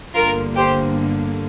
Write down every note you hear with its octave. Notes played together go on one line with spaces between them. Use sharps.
G1 G2 D3 A#3 F4 A#4
G4 C5